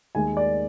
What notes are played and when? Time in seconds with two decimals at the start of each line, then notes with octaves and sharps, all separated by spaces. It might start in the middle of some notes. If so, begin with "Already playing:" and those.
0.15 D#2 D#3 G#3 G#5
0.37 D5